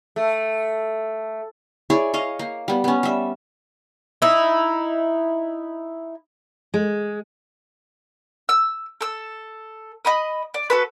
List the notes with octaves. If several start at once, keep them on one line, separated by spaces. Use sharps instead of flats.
A3
E4 G#4 C#5 D5
C#5 D#5 F5
A#3
G3 B3
B3 C#4
G3 E5
D#4 E4
G#3
E6
A4 E6
D#5 B5 D#6
D5
F#4 A4 B4